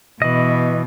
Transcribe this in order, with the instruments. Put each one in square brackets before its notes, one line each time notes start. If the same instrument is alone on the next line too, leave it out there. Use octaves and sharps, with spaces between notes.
[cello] B2 [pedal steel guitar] E3 D#5